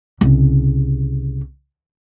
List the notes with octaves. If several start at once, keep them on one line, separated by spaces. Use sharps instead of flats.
C2 C#3